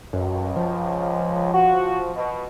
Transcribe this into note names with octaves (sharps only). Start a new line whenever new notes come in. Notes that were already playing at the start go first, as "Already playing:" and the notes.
C#2 F#2
F3
F#4
B2